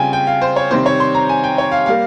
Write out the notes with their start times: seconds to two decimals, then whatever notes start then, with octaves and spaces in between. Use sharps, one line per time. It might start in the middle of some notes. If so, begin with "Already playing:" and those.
Already playing: C#3 G3 C4 F4 G5 G#5
0.13 G5
0.27 F5
0.41 C5
0.56 C#5
0.71 C3 D#3 G3 C4 C5
0.86 C#5
1.00 C6
1.15 A#5
1.29 G#5
1.44 G5
1.58 C#5
1.72 F5
1.86 G3 A#3 F5